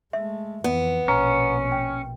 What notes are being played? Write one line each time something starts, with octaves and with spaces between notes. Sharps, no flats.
G#3 A3 E5
F2 E3 B3
A#1 B2 C#4 A#5
G5